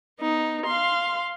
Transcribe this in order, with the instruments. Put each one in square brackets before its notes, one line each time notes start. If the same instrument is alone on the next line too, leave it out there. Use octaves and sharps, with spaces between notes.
[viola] B3 D#4
F5 C6